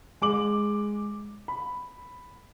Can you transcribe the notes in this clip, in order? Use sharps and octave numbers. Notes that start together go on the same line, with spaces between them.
G#3 D6 F#7
B5